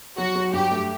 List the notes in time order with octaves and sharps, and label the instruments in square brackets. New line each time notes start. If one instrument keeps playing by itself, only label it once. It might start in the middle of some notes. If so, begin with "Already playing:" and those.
[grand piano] F#3 [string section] F#4
[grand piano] F#3
[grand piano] G2 [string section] G4
[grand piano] A3